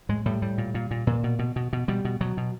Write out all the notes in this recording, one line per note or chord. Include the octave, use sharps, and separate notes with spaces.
A2 G#3
A2 G3
A2 G3
A#2
A#2
A#2
A#2
B2
B2
B2
B2
B2 G3
B2
B2 F#3
B2